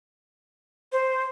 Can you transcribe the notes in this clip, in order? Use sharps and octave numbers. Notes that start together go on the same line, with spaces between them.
C5